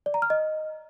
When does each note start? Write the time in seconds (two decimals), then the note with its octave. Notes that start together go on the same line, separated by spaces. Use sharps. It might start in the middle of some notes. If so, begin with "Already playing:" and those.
0.06 D5
0.14 A#5
0.22 F6
0.30 D#5